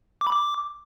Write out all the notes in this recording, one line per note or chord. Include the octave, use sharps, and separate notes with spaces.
D6
B5
D6